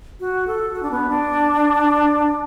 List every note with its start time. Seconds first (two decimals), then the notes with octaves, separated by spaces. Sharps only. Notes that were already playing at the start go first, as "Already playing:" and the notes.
0.20 F#4
0.47 A4
0.73 F#4
0.82 D4
0.91 B3
1.09 D4